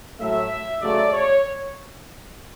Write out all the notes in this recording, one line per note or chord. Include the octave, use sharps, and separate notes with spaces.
A2 F#3 A3 E5
C#3 F#3 A3 D5
C#5